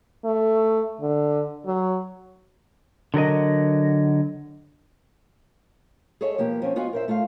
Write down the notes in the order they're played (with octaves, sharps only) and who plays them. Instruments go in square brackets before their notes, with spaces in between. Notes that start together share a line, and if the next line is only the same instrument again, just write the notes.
[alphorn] A3
D3
F#3
[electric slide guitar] D3 F#3 A#4 D#5
[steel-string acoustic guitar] G#4 A4 C#5 D#5 E5
B2 F3 A#3 G4
F3 C4 C#4
B3 F4 F#4 D#5 G#5
A#4 C5 E5
A3 F4 E5 F5